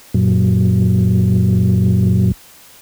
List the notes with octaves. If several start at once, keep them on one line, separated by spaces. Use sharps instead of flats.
F#2 A#2 F#3